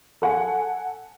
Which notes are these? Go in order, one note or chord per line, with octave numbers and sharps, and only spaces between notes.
A4 F#5 G#5